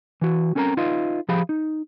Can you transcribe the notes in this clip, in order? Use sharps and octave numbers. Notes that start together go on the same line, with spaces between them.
E3 F#4
C4 C#4 A4 A#4 A5 A#5
D#4 F4 B4 D#5 F5
F3 G4 G#4 F5 B5
D#4